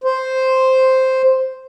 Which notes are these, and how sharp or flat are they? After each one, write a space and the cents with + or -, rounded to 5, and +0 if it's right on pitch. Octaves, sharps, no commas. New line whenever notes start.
C5 +0